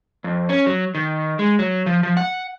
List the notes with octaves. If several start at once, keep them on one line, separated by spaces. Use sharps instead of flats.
F2
C#4
F#3
D#3
G#3
F#3
F3
F3
F#5